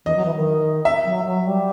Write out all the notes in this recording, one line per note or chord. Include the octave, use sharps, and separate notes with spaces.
E3 D#5
F#3
E3
D#3
E5
F#3
F#3
G3